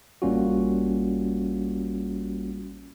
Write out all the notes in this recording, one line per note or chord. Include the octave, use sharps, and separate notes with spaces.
A1 G3 A#3 C#4 F4 F#4